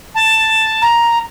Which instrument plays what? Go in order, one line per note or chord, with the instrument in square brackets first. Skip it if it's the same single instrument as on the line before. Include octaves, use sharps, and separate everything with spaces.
[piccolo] A5
[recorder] A#5